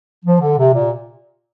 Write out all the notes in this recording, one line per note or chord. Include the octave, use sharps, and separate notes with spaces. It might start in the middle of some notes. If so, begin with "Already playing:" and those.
F3
D3
C3
A#2